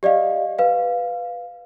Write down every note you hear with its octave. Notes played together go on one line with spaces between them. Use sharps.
G4 D5 D#5 F5
B4 F5